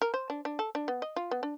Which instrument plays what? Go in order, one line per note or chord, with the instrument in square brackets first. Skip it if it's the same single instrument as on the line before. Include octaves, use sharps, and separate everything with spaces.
[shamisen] A#4
C5
D4
D4
A4
D4
B3
D#5
F4
B3
D4